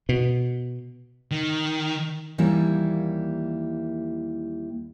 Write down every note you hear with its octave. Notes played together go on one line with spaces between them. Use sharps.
B2
D#3
D#2 E3 G3 A#3 E4